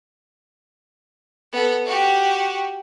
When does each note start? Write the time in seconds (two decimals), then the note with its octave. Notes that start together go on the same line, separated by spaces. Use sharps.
1.53 B3 A4
1.85 F#4 G4